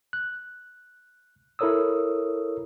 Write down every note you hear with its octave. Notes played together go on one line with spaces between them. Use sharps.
F#6
E4 A4 A#4 C#5 D#6 E6